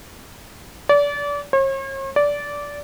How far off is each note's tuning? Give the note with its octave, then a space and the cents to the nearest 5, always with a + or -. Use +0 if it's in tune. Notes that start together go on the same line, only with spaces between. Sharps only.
D5 -30
C#5 -45
D5 -15